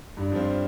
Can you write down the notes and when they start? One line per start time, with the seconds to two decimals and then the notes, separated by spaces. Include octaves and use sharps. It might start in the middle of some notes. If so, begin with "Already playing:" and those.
0.17 G2
0.32 F3 C4